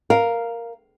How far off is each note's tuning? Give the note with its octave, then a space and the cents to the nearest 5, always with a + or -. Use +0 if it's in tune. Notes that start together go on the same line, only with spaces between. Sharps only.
A#4 +0 F5 +0